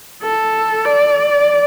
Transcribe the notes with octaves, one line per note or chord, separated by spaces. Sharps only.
A4
D5